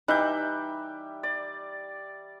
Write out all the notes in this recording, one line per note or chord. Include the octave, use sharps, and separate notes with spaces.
E3 G3 D#4 E5 D6 F#6 G6
D5